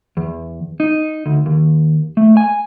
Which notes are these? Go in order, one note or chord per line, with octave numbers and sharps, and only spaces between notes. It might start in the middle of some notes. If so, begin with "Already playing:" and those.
E2
D#4
D2
D#2
A3
G#5